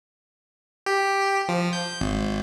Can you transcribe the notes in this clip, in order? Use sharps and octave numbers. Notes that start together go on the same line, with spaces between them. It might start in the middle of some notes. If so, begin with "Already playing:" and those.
G4
F3
G6
G#1